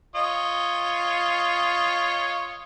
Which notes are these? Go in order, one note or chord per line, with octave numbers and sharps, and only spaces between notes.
F4 C#5 D#5